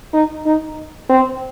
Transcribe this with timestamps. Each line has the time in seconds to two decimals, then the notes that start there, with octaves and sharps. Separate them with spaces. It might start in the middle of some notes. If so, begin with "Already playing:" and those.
0.13 D#4
0.46 D#4
1.09 C4